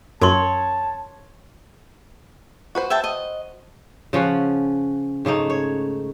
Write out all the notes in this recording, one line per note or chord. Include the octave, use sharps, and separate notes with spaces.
F#2 A#4 C#5 A5 C6
F#4 B4 C5
E5 G5 A5
D#5
C#3 F3 C#4 F#5
G#2 C#3 A3 D#4
C#5